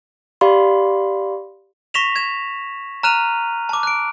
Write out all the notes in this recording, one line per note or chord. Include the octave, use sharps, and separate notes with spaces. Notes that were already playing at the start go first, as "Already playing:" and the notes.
G4 D5 F5 B5 C6
C#6 A#6 B6 E7 F7
G#6 E7
A#5 F6 F#6 D#7 F7
A5 D6
F#6 D7